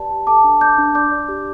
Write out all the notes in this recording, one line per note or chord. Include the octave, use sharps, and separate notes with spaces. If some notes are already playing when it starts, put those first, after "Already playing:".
Already playing: G4 B4 D5 A5
G4
A4 A5 D6
D4
D5 D6 G6
D4
D5 D6 G6
D5
G4